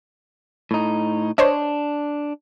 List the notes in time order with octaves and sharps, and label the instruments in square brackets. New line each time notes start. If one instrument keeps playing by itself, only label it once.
[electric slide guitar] A2 D#4
[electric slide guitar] D4 [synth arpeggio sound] C5 C#5 D#5